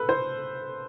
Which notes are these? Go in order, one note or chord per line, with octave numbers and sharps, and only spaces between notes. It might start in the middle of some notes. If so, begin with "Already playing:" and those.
Already playing: A4 B4
C5